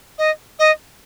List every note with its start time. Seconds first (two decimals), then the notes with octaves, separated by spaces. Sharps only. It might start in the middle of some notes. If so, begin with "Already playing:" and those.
0.18 D#5
0.59 D#5